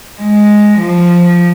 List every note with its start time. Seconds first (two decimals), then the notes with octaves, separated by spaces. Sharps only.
0.21 G#3
0.80 F3